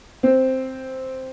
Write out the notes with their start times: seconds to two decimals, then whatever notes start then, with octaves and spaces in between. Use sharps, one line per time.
0.23 C4